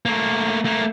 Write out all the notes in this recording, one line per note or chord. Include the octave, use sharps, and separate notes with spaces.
A3 A#3
A3 A#3